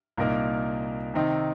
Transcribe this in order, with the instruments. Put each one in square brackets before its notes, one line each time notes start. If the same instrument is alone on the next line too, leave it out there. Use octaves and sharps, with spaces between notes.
[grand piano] C2 A#2 A#3 D#4 A#4
C3 D#3 C4 D#4